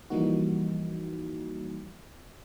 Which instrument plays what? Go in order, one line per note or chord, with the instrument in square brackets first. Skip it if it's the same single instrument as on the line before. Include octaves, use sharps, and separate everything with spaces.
[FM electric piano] E3 F3 G3 A#3 D#4 F#4